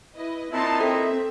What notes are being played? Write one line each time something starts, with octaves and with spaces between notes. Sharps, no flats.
E4 B4 D#5
A#2 C4 D#4 E4 A5 C6
C4 A4 E5